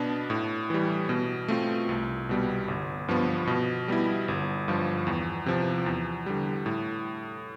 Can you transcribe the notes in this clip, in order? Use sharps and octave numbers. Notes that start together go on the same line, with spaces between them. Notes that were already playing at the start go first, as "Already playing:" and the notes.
Already playing: B2 B3 D4
A2
E3 G3
B2
A3 C4 F4
C2
B2 G3 B3
G1
G2 F3 B3
B2
G3 B3 E4
G1
G2 F3
E2
C3 F3
E2
D3 G3
A2